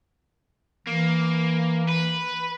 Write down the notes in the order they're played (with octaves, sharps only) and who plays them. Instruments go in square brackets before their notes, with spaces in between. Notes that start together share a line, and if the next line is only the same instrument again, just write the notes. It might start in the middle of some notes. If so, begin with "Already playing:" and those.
[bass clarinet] E3 [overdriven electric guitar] A#3
[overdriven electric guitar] B4